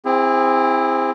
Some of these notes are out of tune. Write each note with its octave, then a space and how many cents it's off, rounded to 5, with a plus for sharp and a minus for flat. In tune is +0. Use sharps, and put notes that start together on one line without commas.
C4 +0 E4 +5 G#4 -35